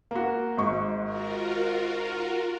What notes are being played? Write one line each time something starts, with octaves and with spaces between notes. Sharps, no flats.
A#3 F#4
G#1 G#2 C#6
F4 F#4 A#4